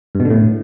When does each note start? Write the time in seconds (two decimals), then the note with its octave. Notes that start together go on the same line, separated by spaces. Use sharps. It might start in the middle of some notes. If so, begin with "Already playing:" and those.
0.15 G2
0.20 B2
0.25 D3
0.30 A2